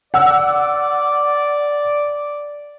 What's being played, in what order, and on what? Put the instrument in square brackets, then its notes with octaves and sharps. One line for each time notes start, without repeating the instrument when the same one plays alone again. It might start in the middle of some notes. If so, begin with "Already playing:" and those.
[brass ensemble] D5 [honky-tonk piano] F#5 E6